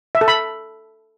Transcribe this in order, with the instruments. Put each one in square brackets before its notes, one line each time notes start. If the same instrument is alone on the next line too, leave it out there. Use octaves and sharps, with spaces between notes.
[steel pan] E5
A4
B5